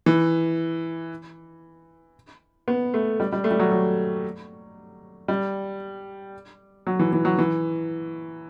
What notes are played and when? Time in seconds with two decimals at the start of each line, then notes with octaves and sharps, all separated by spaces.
0.06 E3
2.68 B3
2.94 A3
3.20 G3
3.32 G3
3.44 A3
3.51 G3
3.59 F#3
3.72 F#3
5.28 G3
6.87 F#3
6.99 E3
7.13 E3
7.25 F#3
7.38 E3